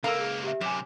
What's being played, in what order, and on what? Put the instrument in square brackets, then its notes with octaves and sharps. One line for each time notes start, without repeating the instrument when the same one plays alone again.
[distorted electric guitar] C#2 A#3 [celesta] A4 A#4 E6 [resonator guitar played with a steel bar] F5 A#5
[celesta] G#4
G4 E5
[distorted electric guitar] F#2 C3 [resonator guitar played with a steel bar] G4 [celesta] G#5 D6 E7